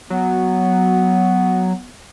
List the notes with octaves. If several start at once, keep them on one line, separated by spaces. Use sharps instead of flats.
F#3 B3